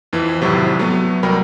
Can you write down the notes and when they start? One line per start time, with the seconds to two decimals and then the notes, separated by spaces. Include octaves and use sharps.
0.13 F2 E3 C4
0.41 G#1 A2 C3 F#3
0.79 F#3 A3 B3
1.23 C2 F#3 A#4 G5 B5